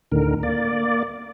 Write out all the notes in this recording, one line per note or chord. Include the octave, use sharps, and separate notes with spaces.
D2 A2 D3 D#3 A#4
A#3 D5